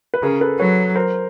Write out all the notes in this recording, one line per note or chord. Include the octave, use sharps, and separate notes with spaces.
B4
C#3 G#4 A#4
A4 B4
F#3 B4 C#5
A#4 C5